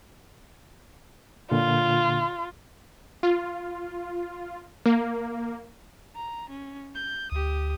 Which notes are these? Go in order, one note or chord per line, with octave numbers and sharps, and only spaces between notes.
A#2 D3 F4
F4
A#3
A#5
C#4
G6
D2 G4 D#6